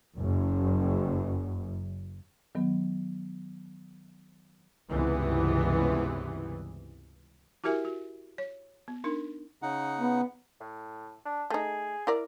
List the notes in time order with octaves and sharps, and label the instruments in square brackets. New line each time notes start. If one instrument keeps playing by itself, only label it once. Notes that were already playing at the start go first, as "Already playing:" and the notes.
[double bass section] F#1 F#2
[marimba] D#3 F#3 B3
[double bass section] C#2 G2 C3 E3 B3
[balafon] E4 F#4 G4 A#4 E5 G#5
F#4
C#5
B3
D4 D#4 A#4
[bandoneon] C#3 D#4 F#5
[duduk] B3
[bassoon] A2
D4
[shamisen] A3 D#4 [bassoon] G#4
[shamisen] E4 A#4 D5